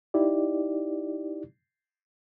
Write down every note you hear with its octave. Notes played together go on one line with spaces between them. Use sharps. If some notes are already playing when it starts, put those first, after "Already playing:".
D#4 E4 G4 D5